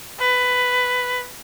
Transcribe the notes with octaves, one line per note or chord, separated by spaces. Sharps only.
B4